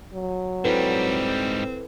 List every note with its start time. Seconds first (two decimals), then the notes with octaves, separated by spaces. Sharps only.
0.14 F#3
0.65 G#2 G3 C4 E4 A4 B4